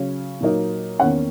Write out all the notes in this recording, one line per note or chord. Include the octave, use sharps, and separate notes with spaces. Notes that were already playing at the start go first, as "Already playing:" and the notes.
Already playing: C#3 F#3 C#4
A#2 F#3 A#3 D#4
E2 D#3 A#3 C#4 F#5